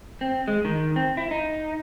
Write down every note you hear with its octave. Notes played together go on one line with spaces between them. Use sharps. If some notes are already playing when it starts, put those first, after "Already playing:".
C4
G#3
D#3
C4
E4
D#4